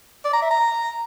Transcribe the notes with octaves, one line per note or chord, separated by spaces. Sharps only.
D5
A#5
E5
A#5